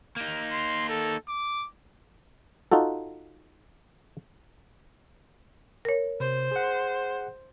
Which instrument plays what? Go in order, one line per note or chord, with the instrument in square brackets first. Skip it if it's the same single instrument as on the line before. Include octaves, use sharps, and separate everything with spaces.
[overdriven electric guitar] A#3 D#4
[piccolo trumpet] C6
A4
D6
[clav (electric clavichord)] D#4 F4 F#4 A4
[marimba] A#4 C#5
[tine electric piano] C3 [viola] C5
[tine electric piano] G#4 F#5